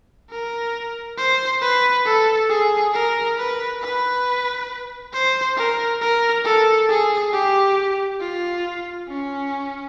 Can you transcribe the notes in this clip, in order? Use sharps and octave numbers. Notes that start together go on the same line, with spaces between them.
A#4
C5
B4
A4
G#4
A#4
B4
B4
C5
A#4
A#4
A4
G#4
G4
F4
C#4